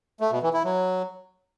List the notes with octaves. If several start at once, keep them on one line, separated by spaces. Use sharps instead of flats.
A3
B2
E3
E4
F#3